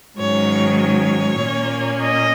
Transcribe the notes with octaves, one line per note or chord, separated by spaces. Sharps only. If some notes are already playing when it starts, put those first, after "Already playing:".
G#2 D#3 F#3 C#4 C#5
C#5
A#2 A#3 C#4
D#5